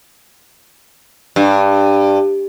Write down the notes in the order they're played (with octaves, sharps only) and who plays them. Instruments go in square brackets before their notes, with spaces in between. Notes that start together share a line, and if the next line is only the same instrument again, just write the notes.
[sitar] G2